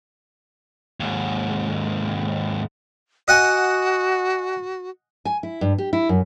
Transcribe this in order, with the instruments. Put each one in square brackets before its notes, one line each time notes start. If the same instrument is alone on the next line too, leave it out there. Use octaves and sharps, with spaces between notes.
[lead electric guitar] D#2 G#2
[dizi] F#4 [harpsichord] D#5 F#5 G#5
[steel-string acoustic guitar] G#5
E4
G2
G4
E4
F#2